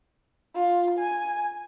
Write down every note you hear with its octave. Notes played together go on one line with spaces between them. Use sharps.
F4
G#5